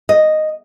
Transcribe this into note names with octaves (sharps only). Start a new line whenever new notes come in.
D#5